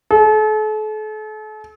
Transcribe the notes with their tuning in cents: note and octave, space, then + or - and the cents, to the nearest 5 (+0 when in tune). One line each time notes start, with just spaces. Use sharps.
A4 -40